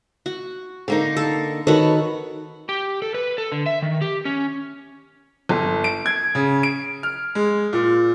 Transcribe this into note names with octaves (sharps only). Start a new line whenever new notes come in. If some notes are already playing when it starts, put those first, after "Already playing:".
F#4
D3 A#3 D#4
A4
D#3 F#4 A4 B4 C#5
G4
A4
B4
A4
D3
E5
D#3
G4
C#4
G1
D7
G#6
C#3
D7
F6
G#3
A#2